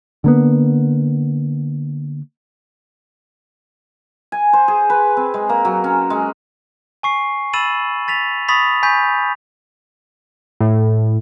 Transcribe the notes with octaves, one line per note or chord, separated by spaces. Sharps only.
D3 A#3 B3
G#5
C5
G#4
B4
C4
G#3
A#3
F#3
C#4
G#3
G#5 C#6 C7
B5 E6 A6 D#7 E7 F#7
A6 B6 F7
B5 C#6 D#6 A6 B6 F7
G#5 B5 C#6 G6 B6
A2